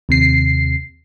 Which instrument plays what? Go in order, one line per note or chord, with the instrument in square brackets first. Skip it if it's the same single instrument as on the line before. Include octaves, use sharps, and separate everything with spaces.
[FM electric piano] D#2 C3 C7